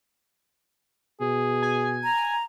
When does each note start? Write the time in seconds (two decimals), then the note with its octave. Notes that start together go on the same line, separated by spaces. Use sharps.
1.21 B2 G#4
1.62 G#5
2.04 A#5